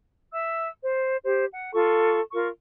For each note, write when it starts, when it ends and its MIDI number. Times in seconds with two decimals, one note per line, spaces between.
0.33 0.68 76
0.33 0.68 88
0.83 1.16 72
1.24 1.44 67
1.24 1.44 72
1.52 1.73 78
1.73 2.19 65
1.73 2.19 69
1.73 2.19 85
2.32 2.48 65
2.32 2.48 70
2.32 2.48 85